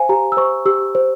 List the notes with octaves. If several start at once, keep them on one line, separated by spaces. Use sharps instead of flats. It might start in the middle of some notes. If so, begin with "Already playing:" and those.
Already playing: C5 F5 G#5
G4 A#5
E6
C5 C#6
G4 E6
C5